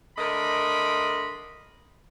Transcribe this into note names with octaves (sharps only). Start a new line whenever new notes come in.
D3 A3 A#4 D#5 B5 C6